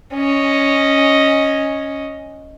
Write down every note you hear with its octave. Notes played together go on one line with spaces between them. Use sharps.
C#4 D#5